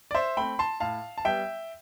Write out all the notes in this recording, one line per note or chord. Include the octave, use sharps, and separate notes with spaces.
D5
C5 E5
A3 C4 G5 B5
A5 C6
A2 F5 A5
A5
G3 B3 E5 G5